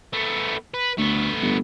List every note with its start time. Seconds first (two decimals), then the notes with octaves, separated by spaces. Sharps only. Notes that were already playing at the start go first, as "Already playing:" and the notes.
0.13 A3 B3
0.74 B4
0.98 D2 A3 B3
1.42 G1